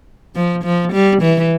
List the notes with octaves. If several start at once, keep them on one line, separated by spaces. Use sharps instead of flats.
F3
F3
G3
E3